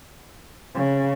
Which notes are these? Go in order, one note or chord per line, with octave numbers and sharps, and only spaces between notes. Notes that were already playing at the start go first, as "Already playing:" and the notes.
C#3